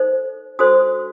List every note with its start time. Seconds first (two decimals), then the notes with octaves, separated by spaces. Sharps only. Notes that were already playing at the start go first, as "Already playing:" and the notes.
Already playing: D#4 A4 C5
0.59 D4 F#4 A4 C5 D#6